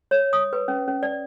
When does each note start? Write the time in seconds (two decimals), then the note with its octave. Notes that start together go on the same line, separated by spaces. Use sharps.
0.11 C#5
0.33 D#6
0.53 B4
0.68 C#4
0.88 C#4
1.03 D5